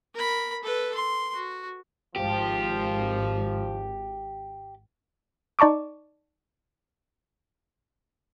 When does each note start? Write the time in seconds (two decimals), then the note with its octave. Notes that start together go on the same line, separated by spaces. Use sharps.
0.15 A#4 B5
0.63 A4 B4
0.94 C6
1.34 F#4
2.16 G#1 F3 G4
5.59 D#4 D5 A5 C#6 D6